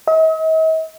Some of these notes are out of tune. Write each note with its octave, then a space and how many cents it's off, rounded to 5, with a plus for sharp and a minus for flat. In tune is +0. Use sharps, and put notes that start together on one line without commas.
D#5 +45